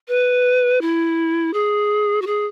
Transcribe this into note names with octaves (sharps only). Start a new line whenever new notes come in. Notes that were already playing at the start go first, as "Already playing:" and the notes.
B4
E4
G#4
F#4
G#4